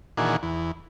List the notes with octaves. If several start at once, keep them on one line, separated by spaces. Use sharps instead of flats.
A#2 D#3 E3 D4 F#4 G#4
E2